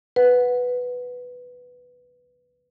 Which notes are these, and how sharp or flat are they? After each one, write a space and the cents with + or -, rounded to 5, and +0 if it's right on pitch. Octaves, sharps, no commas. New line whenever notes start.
B4 +0 F#5 -10